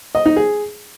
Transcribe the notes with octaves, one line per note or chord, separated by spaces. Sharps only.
D#5
D#4
G#4